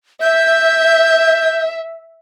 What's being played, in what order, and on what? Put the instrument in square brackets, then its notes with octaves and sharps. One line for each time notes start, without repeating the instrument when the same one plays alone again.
[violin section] E5 [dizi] G6